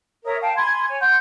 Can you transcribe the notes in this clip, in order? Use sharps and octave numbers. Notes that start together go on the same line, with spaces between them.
A#4 C#5 E5 D#6
F5 G5 A5
G#5 B5 C6 G#6
C#5 G#5
F#5 C6 G6